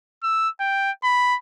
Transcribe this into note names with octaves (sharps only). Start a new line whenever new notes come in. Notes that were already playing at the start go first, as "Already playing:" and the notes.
E6
G5
B5